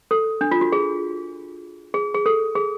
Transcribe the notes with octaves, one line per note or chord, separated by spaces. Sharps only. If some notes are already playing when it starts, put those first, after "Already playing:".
A4
D4
F4
F#4
G#4
G#4
G#4
A4
G#4